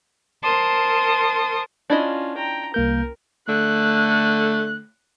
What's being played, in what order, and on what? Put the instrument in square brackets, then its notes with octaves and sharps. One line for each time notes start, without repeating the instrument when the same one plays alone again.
[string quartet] A#4 C5 A5 C6 D#6
[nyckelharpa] C#4 F4 [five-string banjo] D4 E4 D#5
[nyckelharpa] G5 A#5
[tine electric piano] C2 A#3 G6 [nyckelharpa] A#4
[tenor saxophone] D3 [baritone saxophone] A3 [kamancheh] F#6